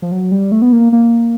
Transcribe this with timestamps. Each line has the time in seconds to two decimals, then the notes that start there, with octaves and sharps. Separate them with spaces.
0.02 F3
0.12 F#3
0.32 G3
0.52 A3
0.62 B3
0.72 A#3
0.92 A#3